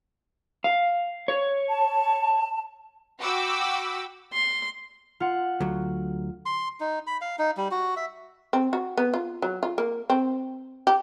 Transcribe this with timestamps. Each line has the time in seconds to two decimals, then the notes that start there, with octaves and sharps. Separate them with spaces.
0.64 F5
1.28 C#5
1.68 A5
3.21 F#4 G5 B5 D6 E6
4.33 C6
5.20 F4 F#5
5.60 D2 F#3
6.46 C6
6.80 D#4
7.07 B5
7.21 F5
7.39 D#4
7.57 G3
7.71 F#4
7.96 E5
8.53 C4
8.73 F#4
8.97 B3
9.14 F4
9.42 F#3
9.63 F4
9.78 A#3
10.10 C4
10.87 G4